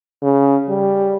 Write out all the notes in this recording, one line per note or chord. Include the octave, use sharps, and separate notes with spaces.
C#3
G3